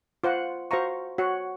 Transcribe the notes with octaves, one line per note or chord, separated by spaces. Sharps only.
F4 C5 F#5
F#4 C5 F5 A#5 C#6
F#4 C#5 F#5